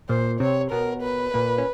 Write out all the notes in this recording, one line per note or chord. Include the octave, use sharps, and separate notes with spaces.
A#2 A#3 C5
C3 C4 C#5
B2 B3 A#4
B4
A#2 A#3
C#4